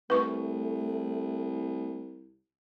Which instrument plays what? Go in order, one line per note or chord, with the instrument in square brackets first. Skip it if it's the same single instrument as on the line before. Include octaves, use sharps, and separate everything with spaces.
[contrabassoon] C2 [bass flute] A3 [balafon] B4 C#6